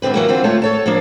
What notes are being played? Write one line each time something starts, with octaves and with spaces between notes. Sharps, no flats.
D2 G#2 D3 C4 B4
E3 F#3 A#3
D3 E3 C4 D4 F4
D2 A3 F4 C#5 A5
A4 C#5 A5
F3 A#3 D4